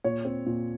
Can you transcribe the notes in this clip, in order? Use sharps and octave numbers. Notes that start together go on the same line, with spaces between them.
A#2 C#5
C4
A#2